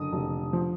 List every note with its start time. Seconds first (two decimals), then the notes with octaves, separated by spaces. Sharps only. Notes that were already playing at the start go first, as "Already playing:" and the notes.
Already playing: F#1 D3 D#6
0.12 F1
0.53 F3